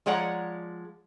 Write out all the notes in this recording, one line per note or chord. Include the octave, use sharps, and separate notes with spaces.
F3 G#3 C#5 D5 F#5 A#5